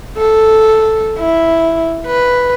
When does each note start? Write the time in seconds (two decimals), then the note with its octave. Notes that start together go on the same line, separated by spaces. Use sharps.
0.18 A4
1.19 E4
2.07 B4